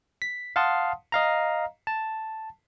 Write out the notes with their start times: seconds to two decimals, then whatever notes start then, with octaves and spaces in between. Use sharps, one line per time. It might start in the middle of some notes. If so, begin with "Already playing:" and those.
0.22 B6
0.56 F5 F#5 A5 C6 D#6
1.12 D#5 F5 A#5
1.87 A5